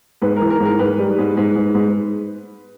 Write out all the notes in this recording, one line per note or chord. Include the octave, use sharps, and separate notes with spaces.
G#2 B4
A#4
E3
A#4
G#2
A#4
G#2 B4
G3
G#2
G#2
G#2
G#2